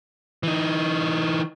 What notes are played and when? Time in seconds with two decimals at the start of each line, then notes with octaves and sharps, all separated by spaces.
0.43 E3 D#4